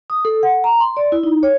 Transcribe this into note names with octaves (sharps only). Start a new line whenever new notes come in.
D#6
A4
F#5
A#5
C6
D5
E4
D#4
C#5